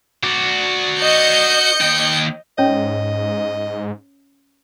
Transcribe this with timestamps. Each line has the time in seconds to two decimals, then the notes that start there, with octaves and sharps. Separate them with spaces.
0.23 F#4 D5
1.00 D#5 G6 C#7
1.81 D#2 G5
2.58 G#2 C#4 C#5 D#5